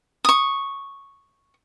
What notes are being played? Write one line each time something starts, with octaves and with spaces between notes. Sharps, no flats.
C#6 D#6